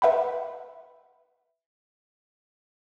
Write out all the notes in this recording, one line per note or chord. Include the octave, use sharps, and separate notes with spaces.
B4 E5 F#5 G5 B5